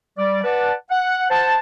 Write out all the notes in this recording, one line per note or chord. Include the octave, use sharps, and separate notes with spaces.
G3 D5
B4 D5 F#5 A5
F#5
C5 F#5 A5